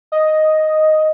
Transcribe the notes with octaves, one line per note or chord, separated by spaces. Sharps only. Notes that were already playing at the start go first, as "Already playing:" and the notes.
D#5